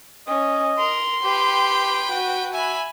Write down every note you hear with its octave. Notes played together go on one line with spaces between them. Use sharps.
C#4 D#5
A#4 C6
G4 B4 G5
F#4
E5 G#5 B5